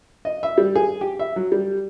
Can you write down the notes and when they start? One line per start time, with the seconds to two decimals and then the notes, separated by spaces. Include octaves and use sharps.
0.25 D#5
0.43 E5
0.58 G3
0.75 G#4
1.01 G4
1.19 E5
1.36 F#3
1.52 G3